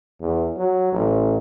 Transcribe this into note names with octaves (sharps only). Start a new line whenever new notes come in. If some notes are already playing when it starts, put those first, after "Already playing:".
E2
F#3
A1